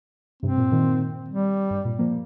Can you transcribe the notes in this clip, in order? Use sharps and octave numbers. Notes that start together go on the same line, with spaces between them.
G2 C3 C4
A#2
A#2 D#3
G3
G2
A#2
F3 A#3